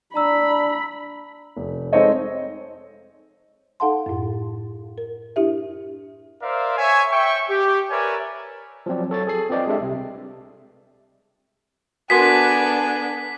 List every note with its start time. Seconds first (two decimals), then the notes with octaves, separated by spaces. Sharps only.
0.15 D4 A#5 B5 E6
1.57 F1
1.93 G#3 C4 D#4 A4 C#5 D#5
3.80 D#4 A4 F5 F#5 A5 C6
4.06 F#2 A2
4.98 A#4
5.36 D4 E4 G4 E5
6.42 A#4 C5 D5 E5 F5
6.78 C#5 E5 G#5
7.12 E5 G5 C#6
7.49 G4
7.90 A#4 B4 C#5 D5 E5 G#5
8.86 F3 F#3 C4 D5
9.10 F#3 A4 C#5 A6
9.27 G#4 A4 C7
9.50 C4 F4 B4 D5 D#5 G5
9.67 G#3 D4 G4 A4 E5
9.80 C2 C3
12.10 B3 D4 F#4 A4 A#4 G#5 C6 B6